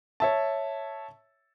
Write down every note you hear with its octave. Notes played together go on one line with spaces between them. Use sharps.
C#5 E5 A5